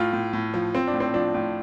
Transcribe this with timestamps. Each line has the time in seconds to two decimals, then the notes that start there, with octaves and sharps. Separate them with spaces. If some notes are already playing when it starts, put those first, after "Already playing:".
Already playing: A2 F4
0.13 A2
0.33 A2
0.54 F3
0.75 F3 C4
0.87 D4
0.94 A2
1.00 C4
1.14 F3 D4
1.34 A2